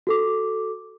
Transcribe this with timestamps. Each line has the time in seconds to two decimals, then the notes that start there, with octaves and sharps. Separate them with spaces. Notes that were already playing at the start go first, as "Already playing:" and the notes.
0.07 F#4 A4 D6